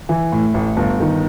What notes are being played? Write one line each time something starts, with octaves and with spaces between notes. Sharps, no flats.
E3
A2
A1
G1
D#3